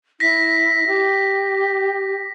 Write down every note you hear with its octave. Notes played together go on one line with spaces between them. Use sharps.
E4 A#6 B6
G4